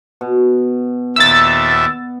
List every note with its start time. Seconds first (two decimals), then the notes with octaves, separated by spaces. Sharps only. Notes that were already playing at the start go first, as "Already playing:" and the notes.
0.21 B2
1.16 D#2 A#2 E5 E6 A6
1.70 B3